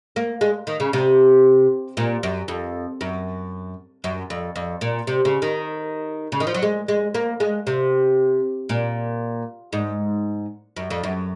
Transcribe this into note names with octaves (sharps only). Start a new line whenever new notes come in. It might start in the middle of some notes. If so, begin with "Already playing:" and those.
A#3
G#3
D#3
C#3
C3
A#2
F#2
F2
F#2
F#2
F2
F2
A#2
C3
C#3
D#3
C#3
D#3
F3
F#3
G#3
G#3
A#3
G#3
C3
A#2
G#2
F#2
F2
F#2